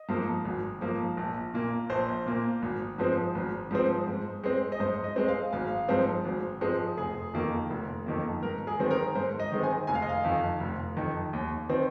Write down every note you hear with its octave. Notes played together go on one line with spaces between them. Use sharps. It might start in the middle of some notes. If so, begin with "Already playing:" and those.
Already playing: D#5
G#2 F3 A#3
G#1
G#2 F3 A#3
A#1
A#2 A#3
A#1 C5
A#2 A#3
G#1
G#2 F3 G#3 C4
G#1
G#2 F3 G#3 C4
G#2
G#3 C4
D#5
G#2 C5
D#5
G#3 C4
F5
G#1 F5
G#2 F3 G#3 C4
G#1
G#2 F3 G#3 C4
F1 G#4
F2 D#3 A#3
F1
F2 D#3 A#3
G#2 A#4
G#4
D#3 G#3 C4
A#4
G#2 C5
D#5
D#3 G#3 C4
G#5
F1 G#5
F5
D#5
F5
F2 D#3
F1
F2 D#3
D#2
D#3 C4